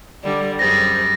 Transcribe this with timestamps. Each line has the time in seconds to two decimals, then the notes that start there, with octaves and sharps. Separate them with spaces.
0.23 D3 G3 D5
0.59 F#2 G3 G#4 C5 A6 A#6